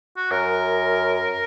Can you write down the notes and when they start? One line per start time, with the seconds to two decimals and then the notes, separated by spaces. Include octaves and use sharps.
0.16 F#4
0.31 F#2 A#4